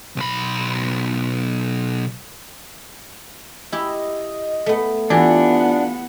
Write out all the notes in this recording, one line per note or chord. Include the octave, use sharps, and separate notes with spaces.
B1 B5
E4 G4 D#5
A3 B3
E3 B3 D4 F4 G4 F#5